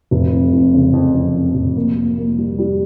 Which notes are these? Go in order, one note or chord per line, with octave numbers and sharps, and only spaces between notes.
F1
F2
F2
C#3
F2
F2
F2
F1
A#3
A#3
A#3
G3
G3